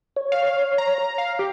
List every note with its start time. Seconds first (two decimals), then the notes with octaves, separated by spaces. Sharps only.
0.17 C#5
0.32 F5
0.78 A#5
1.18 F5
1.39 G4